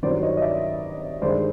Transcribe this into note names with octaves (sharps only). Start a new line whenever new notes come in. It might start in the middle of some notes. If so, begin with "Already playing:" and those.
G2 D#3 F#3 C5 D5
D5
C#5 D#5
D#5
D5 E5
G2 D#3 G#3 C5 D5